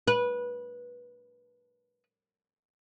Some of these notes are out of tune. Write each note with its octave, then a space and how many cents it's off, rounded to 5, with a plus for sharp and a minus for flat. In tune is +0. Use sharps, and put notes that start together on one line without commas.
B4 -20